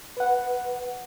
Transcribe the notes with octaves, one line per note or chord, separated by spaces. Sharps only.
B4 F#5